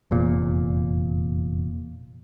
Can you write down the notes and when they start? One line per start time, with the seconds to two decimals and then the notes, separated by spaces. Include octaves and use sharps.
0.11 F1 E2 A#2